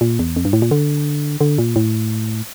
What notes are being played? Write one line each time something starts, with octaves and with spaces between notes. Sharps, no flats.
A#2
E2
F2
G2
A2
A#2
D3
D3
A#2
A2